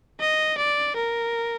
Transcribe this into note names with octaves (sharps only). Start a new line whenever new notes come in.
D#5
D5
A#4